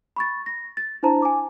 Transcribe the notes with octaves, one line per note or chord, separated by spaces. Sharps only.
B5 C#6 A6
A#6
A6
D4 E4 C5 A5 A#5
G#5 D6